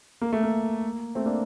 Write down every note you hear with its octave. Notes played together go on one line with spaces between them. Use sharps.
A#3
A3
A#3
A3 C4
A#3 D4